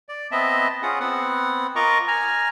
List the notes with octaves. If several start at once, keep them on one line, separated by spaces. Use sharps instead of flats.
D5
B3 C4 D#5 E5 A5
C#4 F4 G#4 F#5
B3 C4 F#5
F4 A#4 D#5 A#5 C#6 D6
G#5 A#5 F6